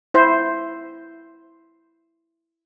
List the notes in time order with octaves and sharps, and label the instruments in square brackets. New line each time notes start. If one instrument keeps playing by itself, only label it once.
[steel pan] E4 C5